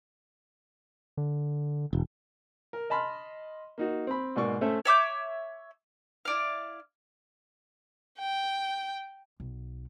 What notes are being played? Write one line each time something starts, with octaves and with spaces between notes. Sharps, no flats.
D3
E1
A#4
D#5 A5 B5 C6 F6
A#3 D#4 F#4
C4 B5
G#2 B2 A#3 D5 C#6
A3 C#4 A4 C5 E5
C#5 E5 D6 G6
E4 D5 F5
G5
B1